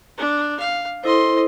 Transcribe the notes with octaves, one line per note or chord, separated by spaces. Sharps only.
D4
F5
E4 A4 C5 D#5 C6